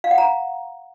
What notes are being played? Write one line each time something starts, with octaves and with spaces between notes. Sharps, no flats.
F5
F#5
A#5